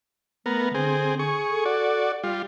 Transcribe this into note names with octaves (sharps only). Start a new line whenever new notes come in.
A3 B3 A#4
D3 C4 G#4
G#4 C#6
A4
F#4 D5
G3 F4